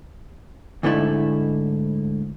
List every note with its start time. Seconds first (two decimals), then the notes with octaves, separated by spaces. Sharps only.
0.83 D2 G#2 D3 A3 D#4 E4